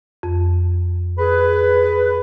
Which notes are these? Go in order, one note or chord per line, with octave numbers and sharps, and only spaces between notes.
F2
G#4 B4